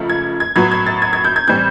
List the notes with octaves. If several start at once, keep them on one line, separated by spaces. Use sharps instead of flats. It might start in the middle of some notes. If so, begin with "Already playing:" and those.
Already playing: C#2 C#3 F3 A3
G#6
G#6
A2 F#3 B3 G#6
G#6
A6
G#6
G#6
G6
G#6
A2 E3 G3 C4 G6